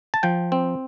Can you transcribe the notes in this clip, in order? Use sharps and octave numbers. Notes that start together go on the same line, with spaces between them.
A5
F3 G5
C4